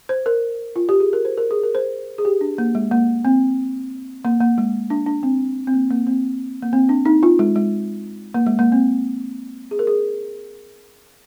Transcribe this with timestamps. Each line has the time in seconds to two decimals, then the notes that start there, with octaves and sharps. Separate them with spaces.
0.09 C5
0.26 A#4
0.76 F4
0.89 G4
1.00 G#4
1.13 A#4
1.25 C5
1.38 A#4
1.51 G#4
1.63 A#4
1.75 C5
2.18 G#4
2.25 G4
2.41 D4
2.58 A#3
2.75 G#3
2.91 A#3
3.25 C4
4.25 A#3
4.41 A#3
4.58 G#3
4.90 D4
5.06 D4
5.23 C4
5.67 C4
5.74 A#3
5.90 A#3
6.07 C4
6.62 A#3
6.73 C4
6.89 D4
7.06 D#4
7.23 F4
7.39 G#3
7.56 G#3
8.34 A#3
8.46 G#3
8.59 A#3
8.72 C4
9.71 G#4
9.79 A#4
9.87 G#4